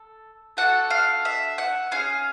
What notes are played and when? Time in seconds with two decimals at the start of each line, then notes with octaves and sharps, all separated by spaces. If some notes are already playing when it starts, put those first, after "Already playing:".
Already playing: A4
0.57 D4 F#4 A4 F#5
0.90 F5
1.25 E5
1.58 F#5
1.91 C#4 F4 G#4 F5